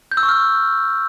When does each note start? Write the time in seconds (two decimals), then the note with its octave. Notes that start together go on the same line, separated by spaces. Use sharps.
0.12 G6
0.17 E6
0.23 C#6
0.29 F6